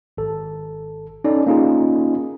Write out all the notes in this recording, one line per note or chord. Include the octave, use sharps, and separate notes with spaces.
G#1 A4
C#4 D#4 A4 D5
A#3 C#4 D#4 F4 G#4